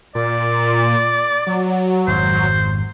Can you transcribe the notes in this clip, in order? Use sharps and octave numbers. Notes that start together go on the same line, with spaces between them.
A#2 D5
F#3
G#1 F2 C5